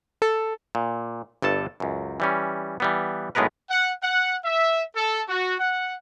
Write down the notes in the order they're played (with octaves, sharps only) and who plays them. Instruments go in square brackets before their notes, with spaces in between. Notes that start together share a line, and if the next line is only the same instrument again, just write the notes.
[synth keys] A4
[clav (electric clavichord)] A#2
G1 G2 A4 A5
C#2 F#2
E3 G3 C#4
E3 G3 B3
B1 A2 G#3 B3 A#4 B4
[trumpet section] F#5
F#5
E5
A4
F#4
F#5